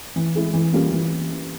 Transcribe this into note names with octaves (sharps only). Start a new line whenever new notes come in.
E3
G#3 E4 G#4
E3
G3 A#3 C#4 F4
E3